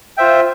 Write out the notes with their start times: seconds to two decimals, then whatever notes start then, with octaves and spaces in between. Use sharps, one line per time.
0.17 F4 C5 E5 G5